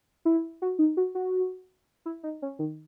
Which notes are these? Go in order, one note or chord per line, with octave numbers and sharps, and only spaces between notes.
E4
F#4
D#4
F#4
F#4
E4
D#4
C#4
D#3